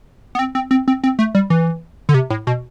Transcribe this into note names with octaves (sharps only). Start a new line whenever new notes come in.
B3
C4
C4
C4
C4
C4
A3
G3
E3
D3
C3
A2
B2